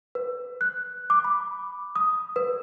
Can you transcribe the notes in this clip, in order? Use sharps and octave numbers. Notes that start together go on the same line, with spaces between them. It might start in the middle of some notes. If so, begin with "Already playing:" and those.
B4
F#6
D6
B5
D#6
B4